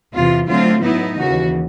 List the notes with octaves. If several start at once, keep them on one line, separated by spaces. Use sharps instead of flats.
E2 C3 E3 F4
D3 F#3 A3 C4 F4
A2 F#3 B3 D#4 E4
D#2 C#3 E3 F#4